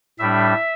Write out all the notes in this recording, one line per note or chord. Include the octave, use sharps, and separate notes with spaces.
A2 G3 D4 E5